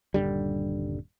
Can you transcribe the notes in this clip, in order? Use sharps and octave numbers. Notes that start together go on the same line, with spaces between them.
D#1 G2 D3 G3